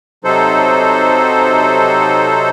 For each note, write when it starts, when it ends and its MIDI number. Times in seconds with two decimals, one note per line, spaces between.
0.24 2.50 48
0.24 2.50 54
0.24 2.50 63
0.24 2.50 69
0.24 2.50 72